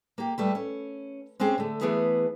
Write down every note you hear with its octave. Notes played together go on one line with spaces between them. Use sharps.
A#3 G4
G3 A3 B4
C#4
G#3 C4 C#4 G4 G#4
D3 A3
E3 A3 B3 G#4 B4